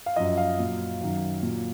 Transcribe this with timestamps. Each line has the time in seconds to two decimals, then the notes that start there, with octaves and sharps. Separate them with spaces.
0.06 F5
0.16 F#2 F3 D#5
0.37 F5
0.59 A#2 F#3
1.01 F#2 D#3 F#3
1.43 A#2 F#3